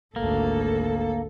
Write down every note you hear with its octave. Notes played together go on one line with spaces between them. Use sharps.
G#1 D2 A#3 A4